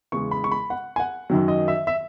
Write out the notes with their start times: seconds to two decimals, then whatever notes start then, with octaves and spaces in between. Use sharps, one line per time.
0.12 E2 C#3 G#3 C#6
0.31 B5
0.44 C#6
0.52 B5
0.70 F#5
0.96 G#5
1.00 F#5
1.30 F#2 D#3 F#3
1.48 D#5
1.68 E5
1.87 E5